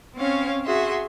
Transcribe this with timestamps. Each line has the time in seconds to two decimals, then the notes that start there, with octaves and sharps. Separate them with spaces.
0.16 C4 C#4 C#5 F5
0.66 F#4 G#4 E5 C6